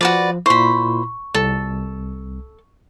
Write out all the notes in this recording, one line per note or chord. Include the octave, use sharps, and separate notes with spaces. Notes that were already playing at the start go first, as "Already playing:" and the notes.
F3 F#4 B4 D5
A#2 E4 C5 B5 C#6
C2 A4